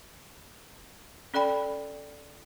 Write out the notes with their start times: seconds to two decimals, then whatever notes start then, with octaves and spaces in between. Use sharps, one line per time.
1.34 C#4 A4 D5 G5 B5